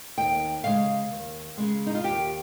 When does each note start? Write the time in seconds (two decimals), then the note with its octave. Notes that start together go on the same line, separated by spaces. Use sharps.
0.18 D#2 G5
0.64 C#3 G#3 F5
1.11 D#2
1.58 C#3 G#3
1.86 D#4
1.95 F4
2.04 D#2 G4